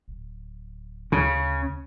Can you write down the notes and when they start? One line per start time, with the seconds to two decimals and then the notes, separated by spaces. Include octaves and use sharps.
0.08 D1
1.12 D2 C#3